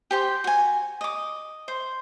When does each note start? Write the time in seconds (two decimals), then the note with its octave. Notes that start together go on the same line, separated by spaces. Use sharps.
0.11 G4 C5 G5
0.44 F#4 G#5
1.01 D#5 D6
1.68 C5